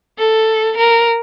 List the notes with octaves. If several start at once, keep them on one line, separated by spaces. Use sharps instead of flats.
A4
A#4